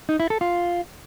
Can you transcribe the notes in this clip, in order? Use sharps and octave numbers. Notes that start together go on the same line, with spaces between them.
D#4
E4
A4
F4